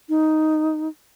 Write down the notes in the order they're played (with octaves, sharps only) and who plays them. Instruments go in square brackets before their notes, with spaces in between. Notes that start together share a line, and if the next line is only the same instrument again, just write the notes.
[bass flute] D#4